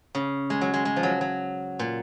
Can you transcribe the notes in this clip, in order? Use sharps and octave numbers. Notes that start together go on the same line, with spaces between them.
C#3
G#3
F#3
G#3
G#3
F3
F#3
F#3
A#2